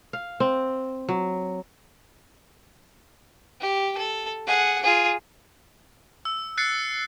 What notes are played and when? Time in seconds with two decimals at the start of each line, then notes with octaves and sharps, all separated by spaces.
0.13 F5
0.40 C4
1.09 F#3
3.61 G4
3.97 A4
4.47 G#4 F#5
4.82 F4 G#4
6.25 E6
6.58 F#6 A6 C7 C#7